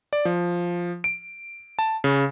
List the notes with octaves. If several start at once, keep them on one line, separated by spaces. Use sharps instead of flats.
D5
F3
D7
A5
C#3